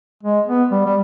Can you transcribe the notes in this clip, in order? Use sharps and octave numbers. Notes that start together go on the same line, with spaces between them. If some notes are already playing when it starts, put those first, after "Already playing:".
G#3
B3
G3
G3